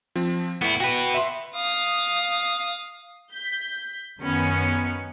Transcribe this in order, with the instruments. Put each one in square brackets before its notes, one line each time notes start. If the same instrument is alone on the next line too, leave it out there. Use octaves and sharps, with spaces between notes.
[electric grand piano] F3 C4
[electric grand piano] A2 [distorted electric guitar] B3 E4
[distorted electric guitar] F#4 B4 [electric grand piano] G5
[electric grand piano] E5 C6
[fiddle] F5 D#6
[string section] G6 B6
F#2 D#3 B3 C#4 B5 C#7